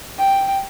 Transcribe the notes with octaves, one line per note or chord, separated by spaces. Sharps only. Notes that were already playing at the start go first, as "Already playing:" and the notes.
G5